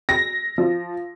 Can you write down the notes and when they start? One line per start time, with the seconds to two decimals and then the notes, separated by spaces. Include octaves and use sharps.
0.09 A#6
0.58 F3